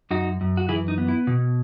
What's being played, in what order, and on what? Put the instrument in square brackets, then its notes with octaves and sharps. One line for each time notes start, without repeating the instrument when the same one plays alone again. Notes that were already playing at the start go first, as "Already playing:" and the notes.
[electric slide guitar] F#2 D#4 F#4
F#2
F#4
E3 E4 G#4
D#4
B3
E4
B2